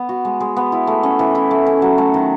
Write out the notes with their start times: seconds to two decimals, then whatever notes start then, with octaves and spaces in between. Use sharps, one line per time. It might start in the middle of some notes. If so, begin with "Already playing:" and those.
Already playing: B3
0.09 F#4
0.25 G#3
0.40 G#3
0.57 B3
0.72 E4
0.87 A3
1.03 C#4
1.19 E3
1.35 E4
1.51 A3
1.66 C#4
1.82 F#3
1.98 A3
2.14 D#3